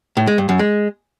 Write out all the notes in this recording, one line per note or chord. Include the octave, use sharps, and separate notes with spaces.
A2
G#3
G2
F#2
G#3